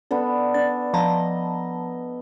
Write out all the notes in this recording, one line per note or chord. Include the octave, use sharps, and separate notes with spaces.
B3 D4 A4
D4 A6
F3 D#5 A5 A#5